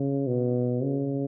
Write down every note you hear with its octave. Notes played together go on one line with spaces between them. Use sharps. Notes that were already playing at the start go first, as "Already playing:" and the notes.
Already playing: C#3
B2
C#3